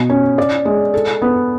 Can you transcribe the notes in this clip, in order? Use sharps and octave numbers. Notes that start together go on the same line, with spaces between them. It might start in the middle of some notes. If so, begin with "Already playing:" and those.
Already playing: B2
C#4
D5
G#3
A4
B3